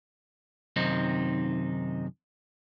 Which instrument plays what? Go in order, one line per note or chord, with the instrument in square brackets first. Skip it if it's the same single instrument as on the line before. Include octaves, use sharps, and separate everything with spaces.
[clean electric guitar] F#2 C3 D#3 C4 D#4